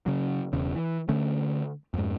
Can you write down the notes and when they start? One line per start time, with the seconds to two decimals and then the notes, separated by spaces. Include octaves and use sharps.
0.06 C#3 F#3
0.53 E1 E2 C#3
0.75 E3
1.09 D3 A3 C#4
1.94 F2 G#2